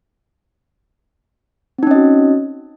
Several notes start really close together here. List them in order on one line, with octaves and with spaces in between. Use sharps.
C4 D#4 C#4 D#5 F#4